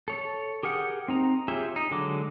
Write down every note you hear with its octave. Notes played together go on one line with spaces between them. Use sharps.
A4 C#5
G4 G#4 A#4 F#5 G5
C4 D#4 A#5
F4 G4 G#4 C#5 E5
D#4
D3 F#3 G#3 D6